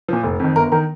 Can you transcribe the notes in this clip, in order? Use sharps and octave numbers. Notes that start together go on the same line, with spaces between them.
A#2 F3
F1
F2 D#3
G1 A#4
D#3 A#4